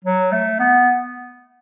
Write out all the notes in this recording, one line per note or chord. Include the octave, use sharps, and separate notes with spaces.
F#3
A3
B3